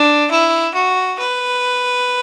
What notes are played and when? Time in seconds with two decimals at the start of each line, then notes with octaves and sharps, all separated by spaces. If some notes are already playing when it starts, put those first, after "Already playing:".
Already playing: D4
0.31 E4
0.74 F#4
1.19 B4